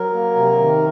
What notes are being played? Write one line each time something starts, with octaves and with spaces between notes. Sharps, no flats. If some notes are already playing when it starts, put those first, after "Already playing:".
Already playing: F#3 A#4
A#3
C3
D#3